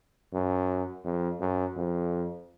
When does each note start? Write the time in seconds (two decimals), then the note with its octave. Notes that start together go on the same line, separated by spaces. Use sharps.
0.33 F#2
1.05 F2
1.41 F#2
1.77 F2